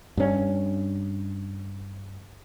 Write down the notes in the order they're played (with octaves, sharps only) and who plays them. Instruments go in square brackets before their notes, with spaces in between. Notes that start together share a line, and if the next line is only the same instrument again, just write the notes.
[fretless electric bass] G2 C#4